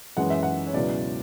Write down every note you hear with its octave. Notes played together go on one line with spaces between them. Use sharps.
F#2 E3 G#3 C#4 F#5
E5
F#5
C#5
C#2 B2 F#3 B3 E4 D5